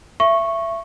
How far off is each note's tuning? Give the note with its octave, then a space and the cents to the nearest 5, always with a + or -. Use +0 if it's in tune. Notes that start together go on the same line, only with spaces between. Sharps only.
E5 +25 C#6 -10